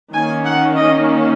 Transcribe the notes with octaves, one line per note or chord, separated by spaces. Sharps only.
D#3 A#3 C#4 G#5
F#5
D#5